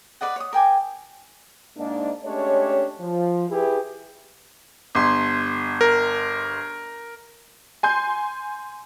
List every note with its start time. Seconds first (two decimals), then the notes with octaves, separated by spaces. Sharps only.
0.21 B4 D5 D#5 F#5
0.36 C#5 D#6
0.53 A#4 G5 G#5 D6
1.77 G#2 A#3 D4 D#4
2.24 G#3 A3 C#4 D4 G4 C#5
2.99 F3
3.50 E4 G4 G#4 B4
4.95 G1 C6
5.81 A#4
7.83 G#5 C6 G6